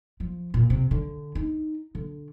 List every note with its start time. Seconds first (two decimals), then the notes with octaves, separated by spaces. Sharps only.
0.20 F3
0.54 A#2
0.70 C3
0.91 D3
1.35 D#4
1.95 D3